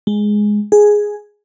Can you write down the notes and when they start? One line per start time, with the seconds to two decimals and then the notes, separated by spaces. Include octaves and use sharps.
0.07 G#3
0.72 G#4